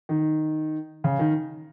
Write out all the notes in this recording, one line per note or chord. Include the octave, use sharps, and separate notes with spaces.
D#3
C#3
D#3